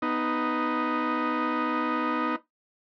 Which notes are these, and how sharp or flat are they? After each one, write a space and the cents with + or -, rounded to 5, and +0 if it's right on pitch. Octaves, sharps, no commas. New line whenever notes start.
B3 +5 D#4 +0